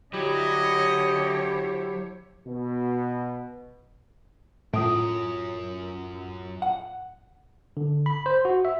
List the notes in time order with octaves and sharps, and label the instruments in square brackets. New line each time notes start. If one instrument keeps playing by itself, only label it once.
[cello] D3 C#5 [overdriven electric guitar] F#3 [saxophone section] E4 G4 [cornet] D#5
[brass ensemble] B2
[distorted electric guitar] F#2 [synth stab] A2 [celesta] F4 D#6 D7
[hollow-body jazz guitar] F#5
[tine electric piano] D3
B5
C5
F#4
E5